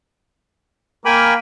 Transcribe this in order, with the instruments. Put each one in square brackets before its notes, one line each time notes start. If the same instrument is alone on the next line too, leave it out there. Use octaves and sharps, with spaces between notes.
[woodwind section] A#3 [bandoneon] G5 G#5 B5